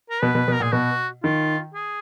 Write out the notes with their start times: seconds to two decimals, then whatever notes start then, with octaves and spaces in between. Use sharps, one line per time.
0.10 A#4
0.22 B2 B4
0.35 B2
0.48 B2
0.53 A#4
0.60 A#2 G#4
0.72 B2 F#4
1.24 D#3 F4
1.74 G#4